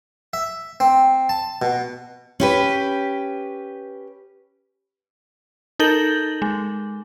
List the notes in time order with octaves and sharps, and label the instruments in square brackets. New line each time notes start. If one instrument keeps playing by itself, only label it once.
[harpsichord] E5
C4
A5
B2
[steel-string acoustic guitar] C#4 G4 B4
[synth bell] D#4 A4 A#4 G6 F#7 G7
G#3